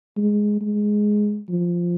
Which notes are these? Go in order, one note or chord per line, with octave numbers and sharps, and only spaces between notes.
G#3
G#3
F3